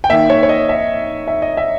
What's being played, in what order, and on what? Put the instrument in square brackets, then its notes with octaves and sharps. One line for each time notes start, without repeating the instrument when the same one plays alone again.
[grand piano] G5
D#3 A#3 E5
C#5
C#5
D#5
E5
E5
D#5
E5